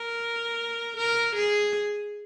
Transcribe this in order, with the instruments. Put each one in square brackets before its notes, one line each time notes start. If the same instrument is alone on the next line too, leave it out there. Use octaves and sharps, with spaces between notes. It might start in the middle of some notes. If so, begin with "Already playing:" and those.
Already playing: [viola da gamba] A#4
A#4
G#4